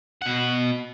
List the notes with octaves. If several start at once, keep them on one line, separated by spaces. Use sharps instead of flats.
B2 F#5